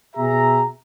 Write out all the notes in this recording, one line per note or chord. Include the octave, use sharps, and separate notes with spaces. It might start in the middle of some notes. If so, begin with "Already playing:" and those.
B2 G#4 E5 A#5